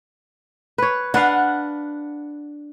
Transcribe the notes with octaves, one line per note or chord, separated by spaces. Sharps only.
B4 C#5
D4 B4 F5 F#5